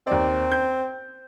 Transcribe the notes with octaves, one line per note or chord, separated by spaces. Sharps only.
D#2 C4 D5
G6